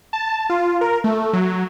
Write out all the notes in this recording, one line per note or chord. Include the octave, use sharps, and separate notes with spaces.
A5
F4
A#4
A3
F#3